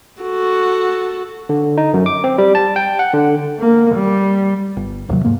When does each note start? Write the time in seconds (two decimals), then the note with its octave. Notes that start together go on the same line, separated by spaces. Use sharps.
0.22 F#4 A4
1.49 D3
1.78 D#4
1.94 F#2
2.06 D6
2.24 C4
2.38 G3
2.55 A5
2.76 G5
2.99 F#5
3.14 D3
3.60 A#3
3.95 G3
4.77 G1
5.09 D1 D#2 C3 F#3
5.24 G#2 A#3